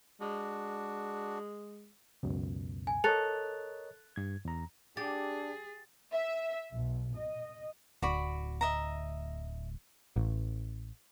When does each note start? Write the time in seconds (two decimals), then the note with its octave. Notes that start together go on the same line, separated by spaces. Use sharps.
0.21 G#3 D4 F#4
2.23 C#2 F#2 B2
2.87 G#5
3.04 A4 A#4 C#5 D#5 F#6 A6 F7
4.16 G2 G#6
4.45 E2 A#5
4.97 D4 G4 G#4 A6
6.14 E5
6.72 B1
7.16 D#5
8.02 D1 F#4 D5 B5
8.61 D#5 E5 A#5
10.16 A1